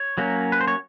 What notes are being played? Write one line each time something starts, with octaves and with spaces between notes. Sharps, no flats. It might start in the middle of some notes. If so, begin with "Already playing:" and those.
Already playing: C#5
F#3 A#3 C#4
B4
C5
C#5